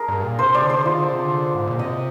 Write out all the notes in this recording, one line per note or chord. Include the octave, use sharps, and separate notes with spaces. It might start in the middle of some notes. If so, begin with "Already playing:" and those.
Already playing: D4 G#4 A#4
G2
A#2
C3 C5
D5
D3
C5
D#3 F4
D3
C3
D3
G#2
A#2
C3 D#5